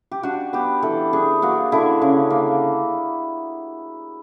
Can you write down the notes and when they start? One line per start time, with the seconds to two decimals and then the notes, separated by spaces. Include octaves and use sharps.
0.12 G4
0.23 D4 F#4
0.53 B3 G4
0.82 E3 A4
1.13 D4 G#4
1.42 A#3 F#4
1.72 D3 E4
2.02 C#3
2.30 A#3